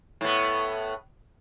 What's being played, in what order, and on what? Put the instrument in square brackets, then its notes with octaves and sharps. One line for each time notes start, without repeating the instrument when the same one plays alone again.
[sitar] A2 B3